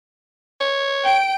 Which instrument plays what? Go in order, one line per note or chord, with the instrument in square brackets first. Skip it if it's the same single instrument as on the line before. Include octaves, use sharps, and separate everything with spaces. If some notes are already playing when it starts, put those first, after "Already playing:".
[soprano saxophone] C#5
[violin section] G5 D7